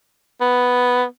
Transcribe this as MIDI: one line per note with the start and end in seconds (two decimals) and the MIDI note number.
0.41 1.04 59